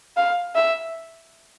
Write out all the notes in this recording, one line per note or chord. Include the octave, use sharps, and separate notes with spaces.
F5
E5